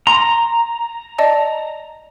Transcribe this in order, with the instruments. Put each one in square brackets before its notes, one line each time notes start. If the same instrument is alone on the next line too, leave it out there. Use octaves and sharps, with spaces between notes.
[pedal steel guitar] A#5 [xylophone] C6
[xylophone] D5 D#5 A5